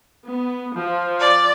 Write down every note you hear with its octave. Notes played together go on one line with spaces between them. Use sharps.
B3
F3
D5